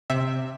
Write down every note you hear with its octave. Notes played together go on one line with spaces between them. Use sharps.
C3 E5